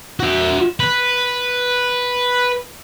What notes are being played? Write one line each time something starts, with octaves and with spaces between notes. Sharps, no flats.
F#4 E5
B4